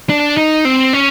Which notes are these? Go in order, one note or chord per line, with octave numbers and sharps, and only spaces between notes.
D4
D#4
C4
C#4